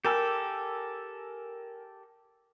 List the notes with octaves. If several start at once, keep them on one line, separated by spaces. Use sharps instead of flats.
G4 A4 A#4 G#5 E6